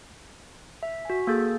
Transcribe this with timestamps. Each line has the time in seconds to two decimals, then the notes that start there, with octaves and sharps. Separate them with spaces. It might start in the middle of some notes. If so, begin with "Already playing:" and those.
0.83 E5
1.05 F#4 G#5
1.27 A#3 G#4 A4 G6 A6